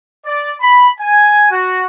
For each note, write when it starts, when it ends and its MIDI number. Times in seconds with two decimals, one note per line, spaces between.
0.25 0.51 74
0.60 0.87 83
1.00 1.49 80
1.50 1.85 66